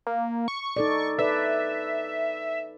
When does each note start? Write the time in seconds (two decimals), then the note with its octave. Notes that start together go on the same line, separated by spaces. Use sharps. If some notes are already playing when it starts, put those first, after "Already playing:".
0.07 A#3
0.48 C#6
0.77 D#4 A4 D5
1.19 A4 B4 D5 E5